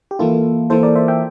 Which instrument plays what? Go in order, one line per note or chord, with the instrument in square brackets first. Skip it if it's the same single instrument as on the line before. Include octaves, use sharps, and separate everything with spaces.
[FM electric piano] G4
E3 A#3 E4 F4 A4
E3 A#3 E4 A4 C5
A#4 D5
C5 E5
E5 G5